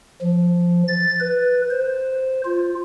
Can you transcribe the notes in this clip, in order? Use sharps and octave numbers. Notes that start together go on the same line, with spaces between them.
F3
A6
B4
C5
F4